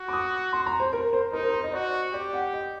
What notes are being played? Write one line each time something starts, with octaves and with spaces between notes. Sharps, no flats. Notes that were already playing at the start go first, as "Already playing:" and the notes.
Already playing: F#4
D6
D#6
C6
A#5
C5
A#4
C5
D#4 A#4
C5
C5
D#5
F#4 D5
G4 D5
F#5
D#5